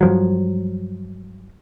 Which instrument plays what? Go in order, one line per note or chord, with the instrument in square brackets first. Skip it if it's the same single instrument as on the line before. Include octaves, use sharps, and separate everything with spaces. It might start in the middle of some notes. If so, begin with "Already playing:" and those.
[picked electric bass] G2 F3 F#3